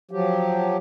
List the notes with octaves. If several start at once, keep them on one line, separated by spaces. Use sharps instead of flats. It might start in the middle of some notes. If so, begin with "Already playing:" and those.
F3 F#3 G4